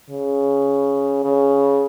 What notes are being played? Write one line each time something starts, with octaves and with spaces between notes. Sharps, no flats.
C#3
C#3